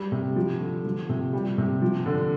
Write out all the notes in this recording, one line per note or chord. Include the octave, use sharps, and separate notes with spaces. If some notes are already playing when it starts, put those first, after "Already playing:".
Already playing: G3
C3
F3
D3
F3
C3
G3
C3
F3
D3